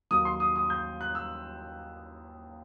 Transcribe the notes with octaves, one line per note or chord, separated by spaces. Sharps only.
D#2 D#3 F#3 D#6
C6
D#6
D#6
G6
F#6
E6